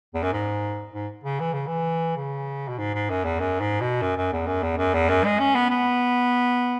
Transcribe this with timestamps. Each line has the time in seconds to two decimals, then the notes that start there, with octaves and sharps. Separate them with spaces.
0.14 E2
0.23 F#2
0.33 G#2
0.94 G#2
1.24 C#3
1.40 E3
1.54 C#3
1.67 E3
2.17 C#3
2.68 B2
2.78 G#2
2.94 G#2
3.10 F#2
3.25 E2
3.40 F#2
3.61 G#2
3.81 B2
4.02 F#2
4.17 F#2
4.33 E2
4.47 F#2
4.63 E2
4.78 F#2
4.94 E2
5.09 F#2
5.25 G#3
5.39 C#4
5.55 B3
5.71 B3